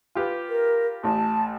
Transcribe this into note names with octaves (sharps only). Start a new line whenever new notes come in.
F4 G4 B4
A#4
A1 A2 A5